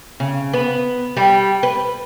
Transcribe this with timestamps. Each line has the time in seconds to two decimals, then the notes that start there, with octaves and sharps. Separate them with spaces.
0.20 C#3
0.53 B3
1.17 G3
1.63 B4